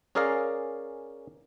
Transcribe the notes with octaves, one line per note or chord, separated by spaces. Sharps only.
C#4 G#4 A#4 D5 F5